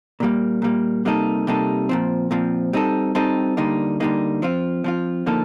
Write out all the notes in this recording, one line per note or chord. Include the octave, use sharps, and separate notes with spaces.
A#2 G3 A#3
A#2 G3 A#3
C3 G3 A#3 D#4 A4
C3 G3 A#3 D#4 A4
A#2 F3 C4
A#2 F3 C4
G3 C4 D#4 A4
G3 C4 D#4 A4
D3 G3 A#3 D#4
D3 G3 A#3 D#4
F3 C4 F4
F3 C4 F4
D3 F3 A#3 D#4 A4